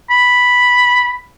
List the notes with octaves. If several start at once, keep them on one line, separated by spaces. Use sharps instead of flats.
B5